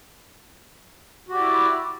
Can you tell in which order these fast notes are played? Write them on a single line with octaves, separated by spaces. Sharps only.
F#4 G4 D5 E4